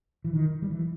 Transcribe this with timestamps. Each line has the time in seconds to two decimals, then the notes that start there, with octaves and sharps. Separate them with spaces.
0.24 E3
0.33 D#3
0.62 G3
0.70 E3